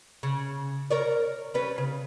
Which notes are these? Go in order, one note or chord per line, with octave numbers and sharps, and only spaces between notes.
C#3
A#4 C#5 D5
G3 C#4 B4
C#3